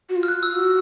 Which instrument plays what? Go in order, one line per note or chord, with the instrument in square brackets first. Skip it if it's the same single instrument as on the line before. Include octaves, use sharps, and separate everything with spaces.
[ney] F#4
F4
[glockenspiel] F6
F#6
E6
[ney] F#4